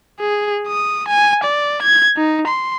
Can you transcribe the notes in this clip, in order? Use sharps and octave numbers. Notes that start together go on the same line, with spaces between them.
G#4
D#6
G#5
D5
G#6
D#4
C6